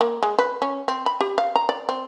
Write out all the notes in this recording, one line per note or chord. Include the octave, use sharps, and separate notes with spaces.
A#3
G#3
B4
C#4
C4
B5
G4
F5
A#5
D5
C4